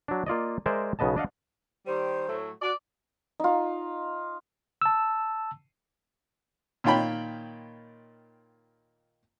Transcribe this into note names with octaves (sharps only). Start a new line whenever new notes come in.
F#3 D4
A#3 F4 D5 D#5
G#3 A#4 C5 D5 E5 G#5
B1 C#3 B3 D#5 A5
D4 D#5 F5 F#5
D#3 G3 C5
A2 F#3 A3
F#4 D5
D#4 F4
A5 E6
A#2 D#3 F4 C#5 G5 B5